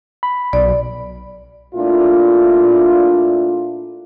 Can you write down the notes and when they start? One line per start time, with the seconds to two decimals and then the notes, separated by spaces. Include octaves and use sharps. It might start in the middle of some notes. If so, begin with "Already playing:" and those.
0.23 B5
0.53 B1 D5
1.75 A#2 A3 D4 E4 F4